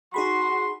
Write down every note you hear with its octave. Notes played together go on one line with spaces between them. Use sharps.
D#4 F#4 G#4 B5 C6